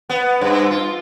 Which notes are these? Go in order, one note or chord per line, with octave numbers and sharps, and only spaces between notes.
B3
G2
F4